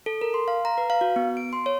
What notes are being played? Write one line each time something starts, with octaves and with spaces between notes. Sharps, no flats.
A4
A#4
C6
F5
A#5
B4
F5
F#4
B3
D7
C6
C#5